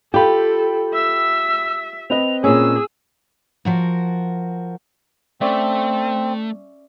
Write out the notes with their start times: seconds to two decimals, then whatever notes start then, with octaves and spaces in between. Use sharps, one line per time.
0.14 F4 G4 A4 G5 B5
0.94 E5 E6
2.10 C4 B4 D#5 F7
2.44 A#2 C#4 G#4 E6
3.65 F3 F#4 A#4
5.41 A3 C4 C#4 D5 E5